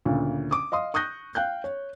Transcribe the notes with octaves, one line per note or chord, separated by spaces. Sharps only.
D2 A#2 C#3
D6 D#6
D#5 F5 C6 D#6
C#6 D#6 F#6 G6 A#6
F5 G5 F#6 G6
C#5